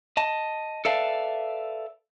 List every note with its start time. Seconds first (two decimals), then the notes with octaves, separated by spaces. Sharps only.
0.17 D#5 A5
0.85 A4 B4 D5 E5 F5 A5